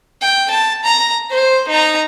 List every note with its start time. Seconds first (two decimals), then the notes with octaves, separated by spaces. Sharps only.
0.22 G5
0.51 A5
0.84 A#5
1.31 C5
1.68 D#4 A#5